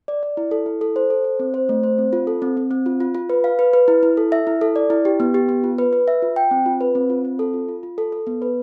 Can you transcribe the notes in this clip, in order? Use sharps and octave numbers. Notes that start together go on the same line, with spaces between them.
D5
D5
E4
A4
E4
A4
C5
A4
C5
C4
C5
A3
C5
C4
F4
A4
C4
C4
C4
F4
F4
F4
B4
F5
B4
B4
E4
E4
A4
E5
E4
A4
D5
E4
G4
B3
G4
B3
F4
B4
B4
E5
F4
G5
C4
F4
B4
C4
F4
C4
A4
F4
F4
F4
A4
A4
B3
B4